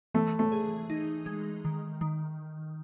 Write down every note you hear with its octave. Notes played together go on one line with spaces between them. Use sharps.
E3 A3
A3
G#4
D#4
G#3
D#3
D#3